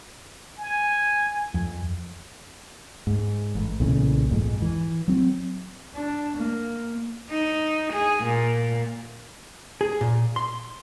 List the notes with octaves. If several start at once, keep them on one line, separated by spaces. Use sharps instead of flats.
G#5
F2
G#2
A1
B1 A#2 C#3 E3
A#1 F2 G#2
E3
F#3 C4
D4
A#3
D#4
G#4
A#2
G#4
A#2
C6